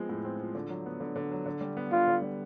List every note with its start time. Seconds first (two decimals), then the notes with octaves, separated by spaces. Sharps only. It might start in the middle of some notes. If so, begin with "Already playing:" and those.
Already playing: F3 G#3 B3 C4
0.09 A2
0.25 C4
0.40 F3
0.55 D3
0.70 F#3
0.86 B3
1.00 D3
1.16 D3
1.31 F#3
1.46 D3
1.61 G3
1.77 B3
1.92 D3 F4
2.07 D3
2.22 G3